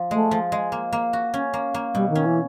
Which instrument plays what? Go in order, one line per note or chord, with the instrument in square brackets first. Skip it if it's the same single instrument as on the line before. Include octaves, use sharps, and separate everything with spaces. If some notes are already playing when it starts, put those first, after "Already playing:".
Already playing: [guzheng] F3
[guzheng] G#3 [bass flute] A3
[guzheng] F3
G#3
A#3
A#3
F#4
C#4
A#3
A#3
[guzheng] B2 [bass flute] G3
[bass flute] D#3
[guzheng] C#4
[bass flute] E3